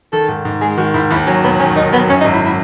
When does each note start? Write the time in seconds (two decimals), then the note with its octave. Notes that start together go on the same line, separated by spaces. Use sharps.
0.13 D#3 A4
0.28 G#2
0.45 G#2
0.61 G#3 G#4
0.78 D#3 F#4
0.94 G#2 E4
1.11 D#2 E4
1.26 F#3 C#4
1.44 E1 B3
1.59 D#3 C#4
1.76 D#2 D#4
1.92 F#3 B3
2.09 F#2 C#4
2.21 D#4
2.25 G#1
2.33 E4
2.45 E4